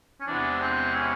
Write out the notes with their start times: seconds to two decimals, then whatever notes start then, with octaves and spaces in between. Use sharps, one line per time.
0.20 C#4
0.27 E2 C3 E3 G#3 B3 D4
0.61 C4
0.95 C#4